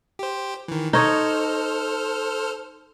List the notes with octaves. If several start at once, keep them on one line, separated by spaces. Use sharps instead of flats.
G4 C5
D#3 E3
D#4 A4 C5 C#5 D#5 F6